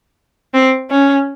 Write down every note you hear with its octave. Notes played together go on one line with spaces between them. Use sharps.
C4
C#4